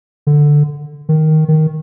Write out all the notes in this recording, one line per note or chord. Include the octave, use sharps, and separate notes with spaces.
D3
D#3
D#3